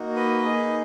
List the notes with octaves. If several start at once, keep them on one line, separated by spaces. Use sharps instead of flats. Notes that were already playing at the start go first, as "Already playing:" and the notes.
Already playing: A#3 D#4 F#4
B4 D#5
A#3 D#4 G#4